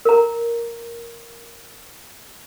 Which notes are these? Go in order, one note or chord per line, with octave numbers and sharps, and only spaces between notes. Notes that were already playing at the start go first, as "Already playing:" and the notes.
A#4 A#5